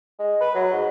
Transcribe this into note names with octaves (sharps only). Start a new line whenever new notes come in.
G#3
B4
F#3
G#2